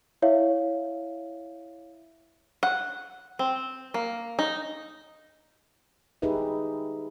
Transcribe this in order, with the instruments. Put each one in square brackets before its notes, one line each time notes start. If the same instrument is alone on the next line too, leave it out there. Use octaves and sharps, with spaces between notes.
[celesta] E4 C#5 E5 F5
[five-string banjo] F#5
C4
A#3
D#4
[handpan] D#4 G4 G#4 B4 E5